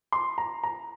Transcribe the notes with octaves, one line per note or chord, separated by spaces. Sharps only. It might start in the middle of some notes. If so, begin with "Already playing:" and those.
C6
A#5
A#5